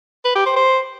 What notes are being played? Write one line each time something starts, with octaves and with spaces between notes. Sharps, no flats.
B4
G4
C5
C5